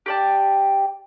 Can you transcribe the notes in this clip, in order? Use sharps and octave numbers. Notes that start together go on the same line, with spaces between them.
G4 D5 A5